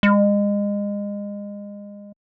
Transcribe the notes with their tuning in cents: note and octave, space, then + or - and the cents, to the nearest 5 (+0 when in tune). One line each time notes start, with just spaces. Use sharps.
G#3 -30